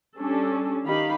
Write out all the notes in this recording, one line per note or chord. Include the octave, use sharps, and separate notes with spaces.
G3 C#4 D4 A4
D#3 D#4 G4 F5 B5